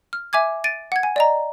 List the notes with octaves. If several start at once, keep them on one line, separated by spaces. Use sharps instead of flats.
F6
E5 G#5 D6 G#6
A6 D7 D#7
F#5 G#6
G#5
D5 D#5 A#5